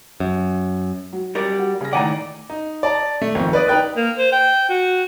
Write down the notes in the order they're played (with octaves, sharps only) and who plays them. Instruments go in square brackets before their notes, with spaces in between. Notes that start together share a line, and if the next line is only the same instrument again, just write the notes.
[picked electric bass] F#2
[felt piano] F#3
[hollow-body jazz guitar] G3 A#4 D5
[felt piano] F#4
C#3 A#6
[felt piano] A2 D#3 F#5 [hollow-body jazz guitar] D5 G#5 A#5
[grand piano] D#4
D5 A5 A#5
A3
G#1 F2
B4 D5 D#6
D#4 B4 G5 F#6
[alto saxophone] A#3
C5
G5
F#4